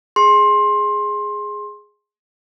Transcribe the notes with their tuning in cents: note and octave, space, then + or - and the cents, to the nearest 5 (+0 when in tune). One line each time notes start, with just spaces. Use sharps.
G#4 +0 C6 +20